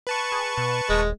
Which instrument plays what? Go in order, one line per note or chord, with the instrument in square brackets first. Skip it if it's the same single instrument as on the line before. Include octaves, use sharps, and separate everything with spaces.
[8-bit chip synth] B4 A5 C#6
[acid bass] G#4
B2
[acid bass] D#1 [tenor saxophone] G#3